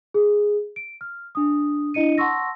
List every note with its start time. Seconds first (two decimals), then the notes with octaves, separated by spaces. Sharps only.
0.14 G#4
0.76 D7
1.01 F6
1.35 D4 D#6
1.94 D4 E4 D#5 C#7 D#7
2.18 F#5 A5 C6 C#6 E6 A#6